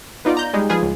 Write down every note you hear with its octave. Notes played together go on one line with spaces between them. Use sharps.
B3 D#4 F4 D5
A#5 G6
G3 G#3 D#4
F3 F4 G#4 B4
C#2